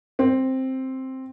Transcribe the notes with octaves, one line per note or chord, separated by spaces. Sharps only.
C4